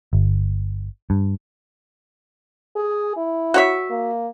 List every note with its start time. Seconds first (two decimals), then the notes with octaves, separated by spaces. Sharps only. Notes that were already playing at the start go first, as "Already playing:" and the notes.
0.13 G1
1.10 G2
2.76 G#4
3.16 E4
3.54 F#4 C#5 E5
3.90 A#3